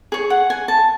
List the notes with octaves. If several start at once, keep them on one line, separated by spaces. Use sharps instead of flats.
G#4 C#5
F#5
G#5
A5